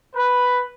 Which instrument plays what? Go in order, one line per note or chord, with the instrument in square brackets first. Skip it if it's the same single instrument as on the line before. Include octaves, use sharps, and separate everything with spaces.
[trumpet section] B4